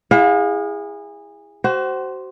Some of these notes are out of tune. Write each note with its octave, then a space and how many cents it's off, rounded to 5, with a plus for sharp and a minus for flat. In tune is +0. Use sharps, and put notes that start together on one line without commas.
E4 +0 G#4 -25 F5 +40
F#4 +35 C5 +0